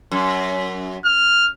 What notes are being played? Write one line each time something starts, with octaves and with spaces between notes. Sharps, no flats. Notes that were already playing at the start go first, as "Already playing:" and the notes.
F#2
F6